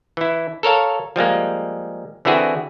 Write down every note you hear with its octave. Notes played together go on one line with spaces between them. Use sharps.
E3 E4
A4 A#4 C#5 F5
F3 G3 G#3 A#3
D3 E3 C4 E4 F#4 G#4